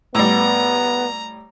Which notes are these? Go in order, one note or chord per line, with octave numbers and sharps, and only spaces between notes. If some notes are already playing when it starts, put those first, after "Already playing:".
A2 G3 B3 A#5